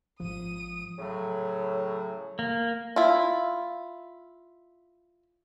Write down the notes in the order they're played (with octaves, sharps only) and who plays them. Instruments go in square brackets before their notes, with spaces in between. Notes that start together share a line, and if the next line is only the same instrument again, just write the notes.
[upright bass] G#1 [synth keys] F3 [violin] D#6 D#7
[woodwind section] A2 C#3 F#3
[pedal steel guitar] A#3
[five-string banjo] E4 F4